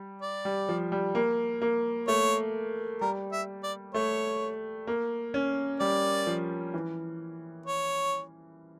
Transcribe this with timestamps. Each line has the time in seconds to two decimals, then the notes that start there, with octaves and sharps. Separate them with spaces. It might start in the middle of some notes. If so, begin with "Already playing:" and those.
Already playing: G3
0.22 D5
0.45 G3
0.69 F3
0.92 G3
1.15 A#3
1.62 A#3
2.08 A3 C#5
3.01 G3 A#4
3.32 E5
3.63 D5
3.94 A3 C#5
4.87 A#3
5.34 C#4
5.80 G3 D5
6.27 F3
6.74 E3
7.66 C#5